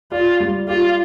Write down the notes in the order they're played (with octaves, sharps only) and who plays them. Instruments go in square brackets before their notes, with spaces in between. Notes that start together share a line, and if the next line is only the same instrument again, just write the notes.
[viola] F4 [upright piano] D5
[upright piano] G3
[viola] F4 [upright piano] G4